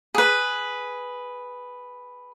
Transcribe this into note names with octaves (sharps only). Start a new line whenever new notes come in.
G#4 B4